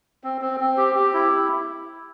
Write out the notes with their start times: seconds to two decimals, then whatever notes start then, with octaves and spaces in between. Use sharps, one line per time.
0.24 C4
0.41 C4
0.60 C4
0.77 G4
0.96 G4
1.14 E4